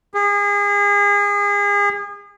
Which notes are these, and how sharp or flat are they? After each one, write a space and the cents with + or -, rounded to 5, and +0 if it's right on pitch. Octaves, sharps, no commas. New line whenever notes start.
G#4 -35